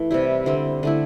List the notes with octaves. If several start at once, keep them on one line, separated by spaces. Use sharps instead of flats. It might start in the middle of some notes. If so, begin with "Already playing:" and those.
Already playing: E3 A3
C3 G3 E4
D3 G3 C4
D3 A3 E4